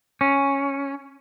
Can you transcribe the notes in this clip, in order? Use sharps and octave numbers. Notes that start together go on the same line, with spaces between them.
C#4